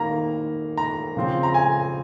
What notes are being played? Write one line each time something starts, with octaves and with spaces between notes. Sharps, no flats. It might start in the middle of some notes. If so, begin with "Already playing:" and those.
Already playing: D#3 A#3 A#5
A#5
C#3 F3 C4
A#5
G#5